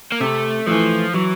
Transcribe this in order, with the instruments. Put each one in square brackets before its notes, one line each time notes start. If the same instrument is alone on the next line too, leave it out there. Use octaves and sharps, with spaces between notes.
[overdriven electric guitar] A#3
[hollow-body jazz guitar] C3 [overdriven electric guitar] A3
[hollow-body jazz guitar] E3 A3 [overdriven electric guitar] F3
[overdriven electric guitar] E3 [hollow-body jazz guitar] F#3